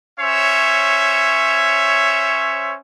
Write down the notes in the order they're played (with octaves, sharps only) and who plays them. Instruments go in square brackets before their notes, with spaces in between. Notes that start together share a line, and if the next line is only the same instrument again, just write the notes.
[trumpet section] C#4 C5 C#5 E5